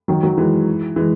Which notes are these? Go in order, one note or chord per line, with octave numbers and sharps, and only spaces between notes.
D#3 F#3
D#3 F#3
E3 G#3
E3 G#3